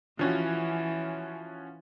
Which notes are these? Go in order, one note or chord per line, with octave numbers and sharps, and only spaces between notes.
E3 F3 C#4 F#4